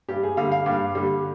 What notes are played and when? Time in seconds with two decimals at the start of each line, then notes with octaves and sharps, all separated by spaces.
0.09 G2 G4
0.23 G#4
0.37 D3 G3 F5
0.52 F5
0.66 G2
0.95 D3 G3